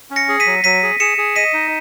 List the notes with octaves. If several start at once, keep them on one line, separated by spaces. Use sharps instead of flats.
C#4
A#6 C#7
G#4
B6 D#7
F#3
F#3 B6 D#7
G#4
G#4 C#7 E7
G#4
D#5 B6 D#7
D#4